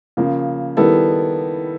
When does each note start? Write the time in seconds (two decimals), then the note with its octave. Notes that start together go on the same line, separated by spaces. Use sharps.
0.17 C#3 F3 A#3
0.77 D#3 G3 B3 E4 A4